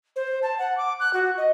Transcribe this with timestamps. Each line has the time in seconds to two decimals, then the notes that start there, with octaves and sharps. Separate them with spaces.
0.16 C5
0.42 A5
0.58 F#5
0.77 D6
1.00 F#6
1.13 F#4
1.37 D#5